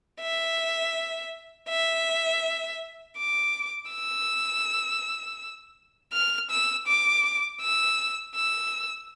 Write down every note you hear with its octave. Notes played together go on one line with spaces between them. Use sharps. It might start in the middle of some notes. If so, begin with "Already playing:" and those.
E5
E5
D6
E6
F6
E6
D6
E6
E6